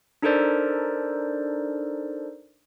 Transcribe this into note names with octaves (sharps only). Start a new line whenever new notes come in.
D4 D#4 A4 A#4 C5 D5